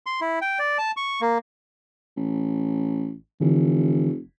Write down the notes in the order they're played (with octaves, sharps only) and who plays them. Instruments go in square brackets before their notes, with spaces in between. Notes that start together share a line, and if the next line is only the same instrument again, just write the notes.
[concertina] C6
E4
G5
D5
A5
C#6
A#3
[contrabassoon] A1
[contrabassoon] F1 [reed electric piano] D3 E3